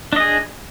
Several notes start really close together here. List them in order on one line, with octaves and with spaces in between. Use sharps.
D4 D#5 G#4